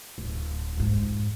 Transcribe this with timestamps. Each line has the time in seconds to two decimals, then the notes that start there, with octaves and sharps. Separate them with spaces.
0.18 D1
0.77 F2 G#2